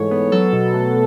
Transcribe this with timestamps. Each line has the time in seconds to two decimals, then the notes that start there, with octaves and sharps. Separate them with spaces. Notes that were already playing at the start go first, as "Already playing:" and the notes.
Already playing: G#2 E3 A3 C#5
0.11 B3
0.32 F#3 A4
0.53 B2
0.74 A3